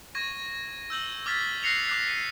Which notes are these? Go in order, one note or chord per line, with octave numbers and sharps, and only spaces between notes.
C#6 G#6 A#6 D#7
E6 G6 F#7 G7
D6 F6 G#6 A6 B6
F#6 A#6 C7 C#7 F7
D6 F#6 C7
C7 D#7